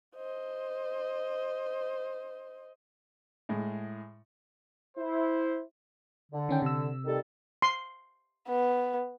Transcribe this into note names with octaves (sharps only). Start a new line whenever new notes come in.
C5 D#5
A2 G#3
E4 C5
D3
D#3 C#4 G5
C3 E6
D#3 G3 A4
C6
B3